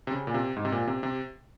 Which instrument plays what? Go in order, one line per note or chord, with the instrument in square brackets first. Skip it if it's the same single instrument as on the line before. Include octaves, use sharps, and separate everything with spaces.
[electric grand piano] C3
C#3
A#2
C3
G#2
C3
A#2
C3
C3